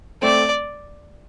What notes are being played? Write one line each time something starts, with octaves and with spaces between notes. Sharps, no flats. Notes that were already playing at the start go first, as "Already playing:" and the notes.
A3 C4 D5